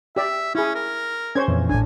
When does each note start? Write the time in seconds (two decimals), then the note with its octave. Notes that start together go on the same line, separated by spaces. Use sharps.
0.16 G4 D5 E5
0.55 C#4 E4 G#4
0.75 A#4
1.35 C#4 C5 C#5 G#6
1.48 F2 A#2 E3
1.69 A1 A2 D4 G#5